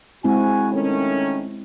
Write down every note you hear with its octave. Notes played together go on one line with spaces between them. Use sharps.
G#3 C4 E4 F#4 G#5
D#3 A3 C#4